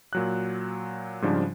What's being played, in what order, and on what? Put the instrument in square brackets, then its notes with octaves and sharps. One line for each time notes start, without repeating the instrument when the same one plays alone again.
[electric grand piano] A#2 F#3 F#6
G#2 C#3 F3 G3 D4